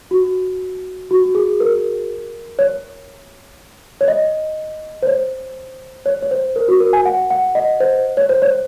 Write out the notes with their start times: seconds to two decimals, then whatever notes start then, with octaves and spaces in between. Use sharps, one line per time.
0.11 F#4
1.11 F#4
1.35 G#4
1.60 A#4
2.59 C#5
4.01 C#5
4.08 D#5
5.03 C5
5.07 C#5
6.06 C#5
6.22 C#5
6.31 C5
6.56 A#4
6.68 F#4
6.80 A#4
6.93 G#5
7.05 F#5
7.31 F#5
7.55 D#5
7.80 C5
8.17 C#5
8.29 C5
8.42 C#5